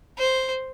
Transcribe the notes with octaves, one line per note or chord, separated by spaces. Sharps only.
C5